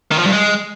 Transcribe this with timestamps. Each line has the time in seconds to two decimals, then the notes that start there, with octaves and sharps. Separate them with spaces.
0.11 D#3
0.19 F3
0.26 G2
0.33 G#3